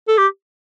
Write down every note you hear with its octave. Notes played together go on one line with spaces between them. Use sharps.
A4
G4